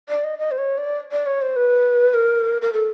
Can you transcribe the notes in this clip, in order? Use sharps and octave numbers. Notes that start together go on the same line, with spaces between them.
D5
D#5
D#5
C5
C#5
D5
D5
C#5
C5
B4
A#4
A#4
A4